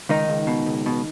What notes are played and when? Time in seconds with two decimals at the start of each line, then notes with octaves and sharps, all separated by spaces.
0.09 C#2 D#3 D#4
0.29 C#2
0.47 B2
0.66 C#2
0.86 B2